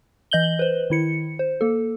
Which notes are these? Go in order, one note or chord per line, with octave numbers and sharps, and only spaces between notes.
E3 D#5 G6 F#7 G7
B4 C5
D#3 E4 C#7
C5
A#3 A4